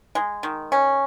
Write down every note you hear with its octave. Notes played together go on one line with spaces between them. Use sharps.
G#3
D#3
C#4